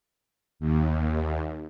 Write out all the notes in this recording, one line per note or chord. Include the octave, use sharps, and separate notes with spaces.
D#2